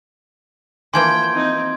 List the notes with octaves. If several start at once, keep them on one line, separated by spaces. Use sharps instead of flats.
E3 F3 A#3 G5 C6 G#6
C4 D#4